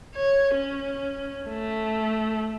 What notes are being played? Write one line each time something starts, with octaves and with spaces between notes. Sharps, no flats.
C#5
C#4
A3